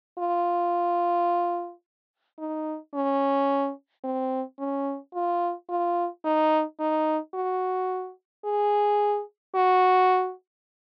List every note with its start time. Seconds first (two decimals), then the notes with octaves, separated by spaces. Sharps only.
0.19 F4
2.38 D#4
2.94 C#4
4.04 C4
4.59 C#4
5.14 F4
5.69 F4
6.25 D#4
6.80 D#4
7.34 F#4
8.45 G#4
9.55 F#4